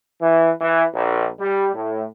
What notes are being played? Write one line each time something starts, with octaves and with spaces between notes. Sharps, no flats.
E3
E3
A#1
G3
A2